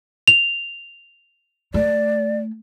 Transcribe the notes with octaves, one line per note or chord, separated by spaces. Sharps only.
F7
A3 D5